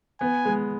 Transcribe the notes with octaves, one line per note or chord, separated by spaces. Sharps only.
B3 G#5
G#3